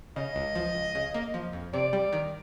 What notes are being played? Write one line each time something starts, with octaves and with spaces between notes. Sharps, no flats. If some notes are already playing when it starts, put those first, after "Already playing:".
C#3 D#5
C#2
F3
C#2
C#3
A#3
F3
F2
C3 D5
G3
D#3